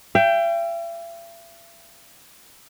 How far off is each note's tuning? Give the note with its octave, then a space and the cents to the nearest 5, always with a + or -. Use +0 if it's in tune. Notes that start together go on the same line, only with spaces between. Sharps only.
E5 +45 G5 +0